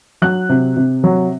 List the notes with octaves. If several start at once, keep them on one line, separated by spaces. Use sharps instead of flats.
F#3 F#6
C3
C3
F#3